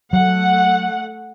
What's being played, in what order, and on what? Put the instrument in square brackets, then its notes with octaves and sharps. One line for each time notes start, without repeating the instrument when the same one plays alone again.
[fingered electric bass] F#3 [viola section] A3 F#5